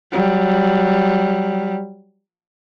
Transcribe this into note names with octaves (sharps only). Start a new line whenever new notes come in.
F#3 G3